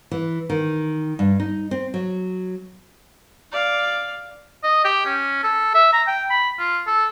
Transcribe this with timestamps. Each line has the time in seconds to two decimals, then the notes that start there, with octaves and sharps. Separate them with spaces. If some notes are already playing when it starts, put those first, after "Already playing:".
0.11 E3
0.50 D#3
1.19 G2
1.40 D#4
1.71 C4
1.94 F#3
3.52 D5 F5
4.63 D#5
4.84 G4
5.06 C#4
5.43 A4
5.75 E5
5.93 A#5
6.07 G5
6.30 B5
6.59 F4
6.87 A4